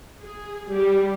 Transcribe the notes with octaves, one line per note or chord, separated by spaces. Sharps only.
G#4
G3